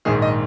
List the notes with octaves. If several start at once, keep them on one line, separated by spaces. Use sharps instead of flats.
A#1 G#2 D#3 G#4
D#5